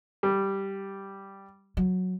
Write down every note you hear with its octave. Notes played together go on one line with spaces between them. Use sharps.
G3
F#3